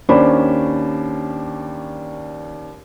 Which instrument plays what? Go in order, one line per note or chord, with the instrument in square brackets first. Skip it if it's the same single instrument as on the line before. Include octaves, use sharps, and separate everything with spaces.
[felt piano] D#2 C#4 D4 C5 D5 B5